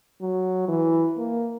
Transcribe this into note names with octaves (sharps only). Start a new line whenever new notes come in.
F#3
E3
A#3